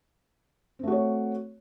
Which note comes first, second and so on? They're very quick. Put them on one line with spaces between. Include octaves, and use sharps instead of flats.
C4 A3 F#4 C#5